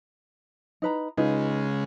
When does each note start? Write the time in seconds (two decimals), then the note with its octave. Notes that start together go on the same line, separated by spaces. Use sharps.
0.82 D#4 B4 A#5
1.18 C#3 G#3 D#4 F4 B4